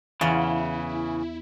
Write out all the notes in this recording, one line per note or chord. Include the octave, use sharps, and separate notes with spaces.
E2 C#3 E3 E4 F4